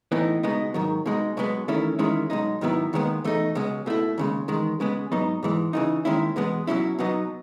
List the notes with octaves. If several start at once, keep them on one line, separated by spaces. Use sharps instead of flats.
A2 E3 B3 D#4
C#2 B2 G#3 B3 D#4
G#2 D#3 F#3
B2 G#3 D#4
B1 B2 G#3 B3
E2 D#3 A3 C#4 E4
E2 D#3 G#3 C#4 E4
B1 B2 G#3 D#4
G#2 D#3 F#3 B3 E4
D#2 D#3 G#3 B3
E2 B2 A3 D#4
C#2 B2 G#3 C#4
B2 A3 E4
D#2 C#3 G#3
E2 D#3 G#3
C#3 G#3 B3
G#2 F#3 B3 D#4
G#2 E3 G#3
C#3 E3 A3 D#4
D#2 D#3 G#3 C#4 E4
E2 B2 G#3 B3
B2 F#3 C#4 E4
B2 F#3 B3 D#4